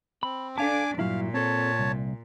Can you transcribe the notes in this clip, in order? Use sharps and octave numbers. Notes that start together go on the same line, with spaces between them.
C4 B5
D4 A4 F5 G#5 A5 D6
G2 A#2 F#3 E4 F5
C4 A4 C#5 A5
C2